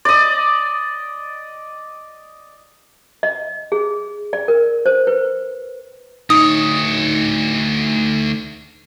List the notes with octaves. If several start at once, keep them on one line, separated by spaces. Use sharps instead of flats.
D5 D#5
D#5
G#4
D5
A#4
C5
B4
D2 D#4 C#5 D#6